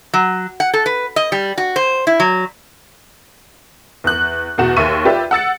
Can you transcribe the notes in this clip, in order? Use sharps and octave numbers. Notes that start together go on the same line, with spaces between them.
F#3
F#5
A4
B4
D#5
G3
F#4
C5
E4
F#3
E2 F#6
E2 B2 F#4 E7
D#2 E5 C#6 D#7
F4 G4 B4 D5 E5
F#5 E6 A6 C#7